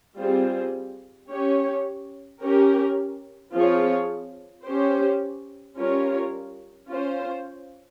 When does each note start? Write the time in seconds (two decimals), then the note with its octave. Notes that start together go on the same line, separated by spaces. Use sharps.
0.20 G3 C4 F4 G#4 C5
1.31 C#4 G4 C#5
2.43 C#4 G4 A#4
3.54 F3 C4 F4 G#4 C#5
4.66 C#4 G4 C5
5.76 G3 C#4 F4 A#4 C#5
6.89 C#4 F4 C5